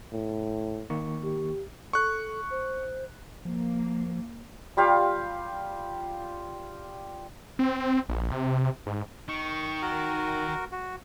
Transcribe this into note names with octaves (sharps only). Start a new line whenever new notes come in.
A2
D#3 A#3 C#6
G4
A4 C#6 F#6
C5
F3 A#3
G3 F4 G4 F5
C4
A#1
C3
G#2
D#3 C#6
F#4 A#4
F#4